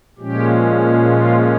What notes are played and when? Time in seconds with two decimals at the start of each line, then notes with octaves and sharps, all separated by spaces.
0.19 A#2 F3 G#3 C#4 G4
1.07 F4